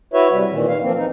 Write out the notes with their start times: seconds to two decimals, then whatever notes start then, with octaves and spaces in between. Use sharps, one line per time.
0.14 E4 F#4 B4 C#5 E5
0.31 C3 G3
0.50 A#2 D#3 E3
0.68 F5
0.83 E3 F3 A#3 C4
0.97 D#4